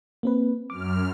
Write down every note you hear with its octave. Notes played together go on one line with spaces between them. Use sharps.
A#3 C4 B4
F#2 D6 F6